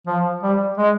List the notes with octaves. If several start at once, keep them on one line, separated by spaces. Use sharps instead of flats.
F3
G3
G#3